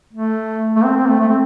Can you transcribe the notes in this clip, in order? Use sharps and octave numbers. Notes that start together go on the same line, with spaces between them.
A3
A3
C4
C4
A3
A3
C4